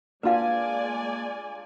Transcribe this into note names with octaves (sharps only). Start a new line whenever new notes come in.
G#3 A#3 D4 F4 B4 D5 F5 G#5